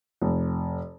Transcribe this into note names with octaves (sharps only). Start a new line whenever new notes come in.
F1